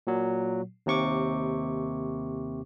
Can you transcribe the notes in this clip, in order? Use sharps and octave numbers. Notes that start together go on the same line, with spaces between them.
A#2 F#3
D#2 C3 C#6 D6